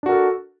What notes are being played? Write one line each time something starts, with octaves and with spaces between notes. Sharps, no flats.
D4 F#4 A4 A#4